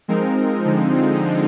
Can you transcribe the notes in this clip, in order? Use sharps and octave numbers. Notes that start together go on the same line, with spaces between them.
F3 G#3 C4 D#4 A#4
D3 F3 G#3 C4 D#4